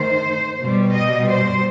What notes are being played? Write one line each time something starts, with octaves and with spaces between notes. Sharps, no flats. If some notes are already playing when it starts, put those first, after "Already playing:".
Already playing: D#3 A3 C5
B2 G3
D#5
C5